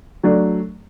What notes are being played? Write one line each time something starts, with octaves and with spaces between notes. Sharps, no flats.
F#3 A3 D4